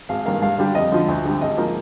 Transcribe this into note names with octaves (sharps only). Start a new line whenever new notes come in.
G#1 F5
G2 D#3 A#3 F5
G2 F5
D3 G3 D4
F2 D#5
D3 F3
D2
D3 G3
G#1 D#5
F3 A#3 D#4